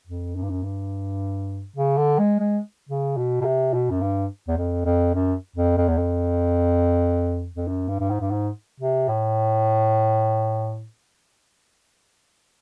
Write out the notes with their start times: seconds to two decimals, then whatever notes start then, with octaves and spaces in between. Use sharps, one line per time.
0.07 F2
0.36 F#2
0.43 G2
0.50 F#2
0.64 G2
1.76 C#3
1.97 D3
2.19 G#3
2.40 G#3
2.89 C#3
3.17 B2
3.41 B2
3.45 C3
3.74 B2
3.91 F#2
4.01 G2
4.48 E2
4.58 F2
4.86 F2
5.15 F#2
5.56 F2
5.78 F2
5.88 E2
5.98 F2
7.56 F2
7.68 F#2
7.89 G2
8.00 G2
8.10 G#2
8.21 G2
8.31 G#2
8.80 C3
9.09 A2